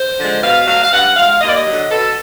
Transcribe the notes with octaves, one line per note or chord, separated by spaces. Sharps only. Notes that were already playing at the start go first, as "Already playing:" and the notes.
Already playing: C5
D3 F3 G#3
B2 F5
F#3 A3 F5
F5
G2 F#5
E3 G#3 F5
D#2 D#5
D5
D#5
D3 F#3
B2 A4